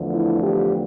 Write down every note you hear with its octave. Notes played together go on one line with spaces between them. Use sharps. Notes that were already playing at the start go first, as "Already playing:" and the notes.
Already playing: E2 D3 F3 A3
E4
G4